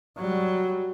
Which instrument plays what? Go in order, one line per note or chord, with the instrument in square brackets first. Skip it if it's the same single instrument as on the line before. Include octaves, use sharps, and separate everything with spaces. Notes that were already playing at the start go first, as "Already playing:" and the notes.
[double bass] F#3 G3